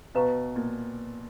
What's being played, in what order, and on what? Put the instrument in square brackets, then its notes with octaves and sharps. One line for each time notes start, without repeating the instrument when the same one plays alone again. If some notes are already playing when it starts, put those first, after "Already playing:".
[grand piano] B2 [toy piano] B4 F5 A#5 C#6
[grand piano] A#2